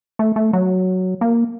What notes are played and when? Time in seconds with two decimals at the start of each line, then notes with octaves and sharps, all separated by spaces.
0.19 A3
0.36 A3
0.53 F#3
1.21 A#3